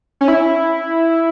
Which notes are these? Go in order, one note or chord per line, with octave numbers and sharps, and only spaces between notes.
C#4
E4